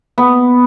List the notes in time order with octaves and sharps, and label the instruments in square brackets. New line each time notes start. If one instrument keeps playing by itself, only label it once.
[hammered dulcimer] B3